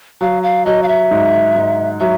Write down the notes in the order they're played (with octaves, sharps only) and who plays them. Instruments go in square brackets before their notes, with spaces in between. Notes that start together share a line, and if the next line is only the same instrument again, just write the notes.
[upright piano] F#3 [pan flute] F5
[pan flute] F5
[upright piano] F#3 [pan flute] D#5
[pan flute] F5
E5
[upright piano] G#2
G#2
[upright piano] F#3 [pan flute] E5